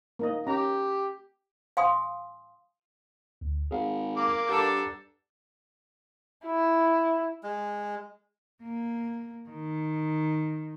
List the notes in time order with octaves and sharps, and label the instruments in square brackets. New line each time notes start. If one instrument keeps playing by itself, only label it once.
[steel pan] A#3 D#4 D#5
[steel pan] C#4 A#5 [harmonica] G4
[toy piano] F5 G#5 C6 D#6
[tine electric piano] D2
[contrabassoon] G#1 [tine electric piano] G#4 F5 F#5
[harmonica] A#3 D6
[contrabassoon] G2 [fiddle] D4 A4 [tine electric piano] F#5 A#5 G6
[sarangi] E4
[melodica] G#3
[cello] A#3
D#3